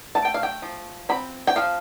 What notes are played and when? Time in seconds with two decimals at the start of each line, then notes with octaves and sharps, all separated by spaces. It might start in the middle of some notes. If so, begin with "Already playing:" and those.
0.15 A3 A5
0.25 G5
0.34 F5
0.43 G5
0.62 F3
1.09 C4 B5
1.47 G5
1.56 F3 F5